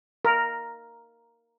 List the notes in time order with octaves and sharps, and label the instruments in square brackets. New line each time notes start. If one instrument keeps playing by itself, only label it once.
[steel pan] A#4